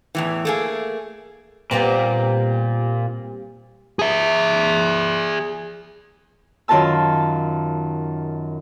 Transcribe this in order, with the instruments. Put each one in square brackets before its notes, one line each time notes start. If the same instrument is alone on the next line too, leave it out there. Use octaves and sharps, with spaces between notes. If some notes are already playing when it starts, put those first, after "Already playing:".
[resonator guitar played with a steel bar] E2 A2 E3
A3 A#3 G#4
[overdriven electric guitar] A#2 [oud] G3 B3 C4
[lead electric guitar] G#4 E5
[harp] F#2 D#3 F4 A#4 A5 E6